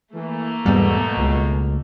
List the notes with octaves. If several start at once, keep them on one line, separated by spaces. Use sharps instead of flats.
E3 A3 A#3
E2 G#2 B2 G3
C#2